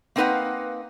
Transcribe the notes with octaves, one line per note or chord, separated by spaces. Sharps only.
A#3 C4 D#4 B4 F5 F#5